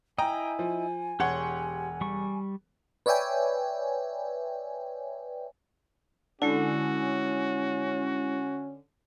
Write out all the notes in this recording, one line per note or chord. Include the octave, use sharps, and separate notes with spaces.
E4 D#5 G5 G#5 A#5
F3
E1 G4 C#5 F#5 C6 C#6
G3 C#6
B4 C#5 D5 E5 G5 G#5
D3 G#3 C#4 E4 F#4